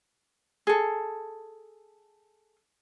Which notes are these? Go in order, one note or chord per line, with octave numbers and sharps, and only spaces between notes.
G#4 A4